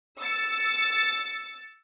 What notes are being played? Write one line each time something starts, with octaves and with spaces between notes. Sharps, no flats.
E6 A6 C#7